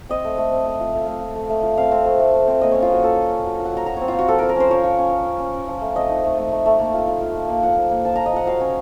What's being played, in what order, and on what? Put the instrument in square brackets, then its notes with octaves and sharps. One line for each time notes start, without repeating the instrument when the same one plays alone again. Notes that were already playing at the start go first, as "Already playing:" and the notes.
[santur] C4 D#5
A3
A3
C4
A3
F4
A3 F5
A3
F4
A3
A3
F4
C4 F5
C4
A3
A3
A3
C4
A#3 D#5
C#4 C#5
F4
A#3 F#4
F4 A4
F4
C#4
F#3
F4
F#5
F#3 A#5
F#3 A#5
C4 C#5
F4
C4 F#4
F3 A4
F3 A#4
A#4
C#4 C5
F3 C#5
F3
C#4
F3
C#4
C#4
C#4
F3
A3
C4 D#5
D#4
A3
A3
A3
A3
A#3
F4
F4
F4
F4
A#3
F3 F#5
F3
A#3
F3 A5
F4 A#5
D#5
F3 F#5
F#3 F5
C#4